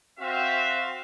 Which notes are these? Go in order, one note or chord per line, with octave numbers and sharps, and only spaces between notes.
C4 F#4 E5 F5